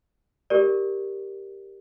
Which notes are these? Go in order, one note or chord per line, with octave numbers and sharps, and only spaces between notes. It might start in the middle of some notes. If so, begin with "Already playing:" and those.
G4 A#4 D5